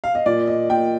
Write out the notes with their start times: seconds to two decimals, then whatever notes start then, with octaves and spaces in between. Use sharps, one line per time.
0.04 F5
0.15 D#5
0.26 A#2 D5
0.47 D#5
0.70 A#2 G5